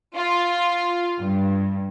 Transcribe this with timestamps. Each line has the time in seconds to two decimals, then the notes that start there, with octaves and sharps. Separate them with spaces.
0.16 F4
1.19 G2